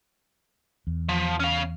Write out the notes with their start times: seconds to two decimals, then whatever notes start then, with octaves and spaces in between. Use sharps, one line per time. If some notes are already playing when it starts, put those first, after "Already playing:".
0.87 E2
1.09 F3
1.40 C#4 F5